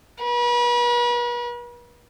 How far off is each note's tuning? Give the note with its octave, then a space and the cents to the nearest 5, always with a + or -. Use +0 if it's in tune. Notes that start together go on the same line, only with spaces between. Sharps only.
B4 -40